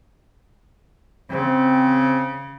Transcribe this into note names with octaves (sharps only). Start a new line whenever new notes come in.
C#3 C4